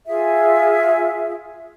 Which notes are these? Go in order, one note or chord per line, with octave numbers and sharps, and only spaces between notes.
F4 G#4 E5